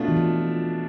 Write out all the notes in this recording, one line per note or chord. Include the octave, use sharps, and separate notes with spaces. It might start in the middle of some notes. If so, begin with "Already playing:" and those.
Already playing: B2 A3 D4 F4
E3
F3